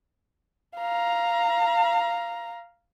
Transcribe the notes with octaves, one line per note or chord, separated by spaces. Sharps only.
F5 A#5